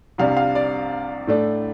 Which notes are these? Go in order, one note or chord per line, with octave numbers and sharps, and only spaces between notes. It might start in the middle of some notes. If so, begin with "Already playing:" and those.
C2 C3 G3 D4 F5
F5
D5
A2 A3 D4